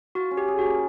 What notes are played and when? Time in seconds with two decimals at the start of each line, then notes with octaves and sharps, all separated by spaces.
0.15 F4 F#4
0.31 C#4
0.37 G4
0.48 G#4
0.59 F#4
0.65 A#3